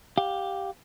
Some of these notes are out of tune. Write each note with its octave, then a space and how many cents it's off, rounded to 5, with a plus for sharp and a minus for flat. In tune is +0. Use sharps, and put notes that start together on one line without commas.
G4 +0 F5 +20